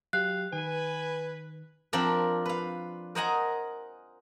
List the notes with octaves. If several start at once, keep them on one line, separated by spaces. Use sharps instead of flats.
F#3 G4 F5 F#6
D#3 B4 G#5
F3 C4 D4 A#4
B4 F5
A#4 C5 D#5 F#5 G#5 A#5